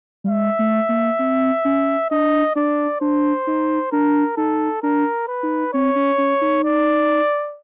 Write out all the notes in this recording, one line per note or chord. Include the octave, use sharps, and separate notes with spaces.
G3
G#3 E5
A3
A#3
C4
C#4
D4 D#5
D4 D5
D4 C5
D#4
D4 A#4
D#4 A4
D4 A#4
B4
D#4
C4 C#5
C#4
C#4
D#4
D5